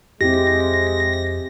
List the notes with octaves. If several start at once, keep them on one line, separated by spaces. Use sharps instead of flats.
F2 G#3 C4 E4 G4 A#6